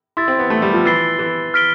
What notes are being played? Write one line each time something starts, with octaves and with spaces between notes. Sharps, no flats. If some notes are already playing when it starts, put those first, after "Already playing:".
E4 C6 E6 A6
C4
B3
A3
G3
F3
E3 B5 E6 A6 C7 G7
E3
F6 B6 D7 G7